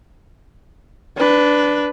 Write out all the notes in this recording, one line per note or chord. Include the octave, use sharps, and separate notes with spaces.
D4 B4